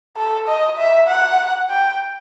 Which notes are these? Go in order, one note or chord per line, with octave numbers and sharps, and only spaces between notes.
A4
D#5
E5
F#5
G5